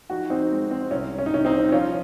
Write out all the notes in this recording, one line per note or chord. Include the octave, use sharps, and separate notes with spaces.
F3 D#4 F#4
C4 D#4
G#3
C4
C2 C#4
C#4
D#4
C2 C#4
C4 D#4
F3 C#4 F4